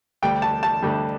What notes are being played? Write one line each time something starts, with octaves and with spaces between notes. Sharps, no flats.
D2 D3 G3 G5
A5
A5
D2 D3 G3